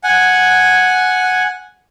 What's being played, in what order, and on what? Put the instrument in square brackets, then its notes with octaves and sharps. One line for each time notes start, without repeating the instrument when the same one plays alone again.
[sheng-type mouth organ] F#5 G#5